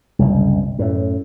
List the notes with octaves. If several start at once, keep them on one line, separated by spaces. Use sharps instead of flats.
F#1 C2
F#2 A2